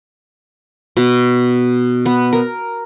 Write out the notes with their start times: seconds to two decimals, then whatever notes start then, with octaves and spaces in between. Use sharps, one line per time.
0.97 B2
2.06 B3
2.33 A#4